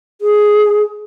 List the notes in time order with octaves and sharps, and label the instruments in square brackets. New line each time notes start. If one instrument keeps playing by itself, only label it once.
[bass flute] G#4